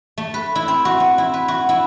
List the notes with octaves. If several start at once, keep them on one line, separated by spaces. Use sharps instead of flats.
A3
B4
E4
C4
F#4
C4
E4
B4
F#4
E4